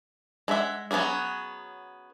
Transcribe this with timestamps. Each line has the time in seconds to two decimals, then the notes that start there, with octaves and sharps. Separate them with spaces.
0.48 G#3 A4 B4 E5 F#5
0.91 F#3 B3 C#4 E4 G#4